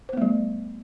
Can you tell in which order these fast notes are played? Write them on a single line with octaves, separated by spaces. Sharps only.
C5 B3 A3 G3